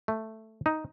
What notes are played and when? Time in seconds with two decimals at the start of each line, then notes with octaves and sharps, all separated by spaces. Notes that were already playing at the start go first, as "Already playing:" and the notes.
0.08 A3
0.66 D#4